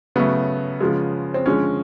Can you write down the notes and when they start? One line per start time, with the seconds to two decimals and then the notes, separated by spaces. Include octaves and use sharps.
0.16 C#3 F#3 A3 B3
0.81 C#3 F3 G#3
1.34 C4
1.46 D3 F3 G#3 C#4